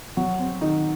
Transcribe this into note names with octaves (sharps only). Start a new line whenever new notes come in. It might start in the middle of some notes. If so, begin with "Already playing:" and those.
F#3 F#4
C4
D#3 D#4